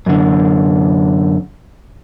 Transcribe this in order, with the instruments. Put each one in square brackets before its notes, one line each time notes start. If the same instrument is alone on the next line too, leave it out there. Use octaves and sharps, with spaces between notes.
[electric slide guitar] F#2 D3